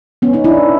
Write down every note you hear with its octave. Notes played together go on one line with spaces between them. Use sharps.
B3 C#4
C#4 D#4
D4 E4